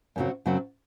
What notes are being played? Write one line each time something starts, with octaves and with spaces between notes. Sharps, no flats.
F#2 C#3 F#3 C4 F#4
F#2 C#3 F#3 C4 F#4